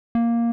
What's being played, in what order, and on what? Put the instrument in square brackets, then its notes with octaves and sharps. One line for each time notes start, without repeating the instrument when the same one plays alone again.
[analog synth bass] A#3